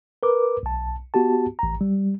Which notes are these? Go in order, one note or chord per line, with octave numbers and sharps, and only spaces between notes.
A#4 B4 D6
B1 A5
B3 F#4 G4 A5
A1 A#5
G3